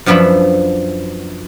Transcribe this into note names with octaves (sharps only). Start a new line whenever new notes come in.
F#2 F3 B3 D4 E5 B5